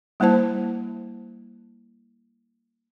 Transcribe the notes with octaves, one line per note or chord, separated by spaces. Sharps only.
G3 A#3 E4 C5 A5